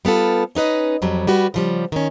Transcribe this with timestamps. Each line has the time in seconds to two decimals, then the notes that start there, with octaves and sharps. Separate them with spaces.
0.05 G3 B3 F4 A4
0.55 C#4 D#4 B4 D#5
1.02 F2 F#3 G3
1.27 G3 F#4 B4
1.54 C#3 F3 G3
1.92 D#3 C#4